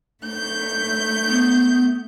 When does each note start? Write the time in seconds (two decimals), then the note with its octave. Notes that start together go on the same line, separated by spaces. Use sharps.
0.22 A3 G6
1.29 B3